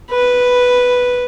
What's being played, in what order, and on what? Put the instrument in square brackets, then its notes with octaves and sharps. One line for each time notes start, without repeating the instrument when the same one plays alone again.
[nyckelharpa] B4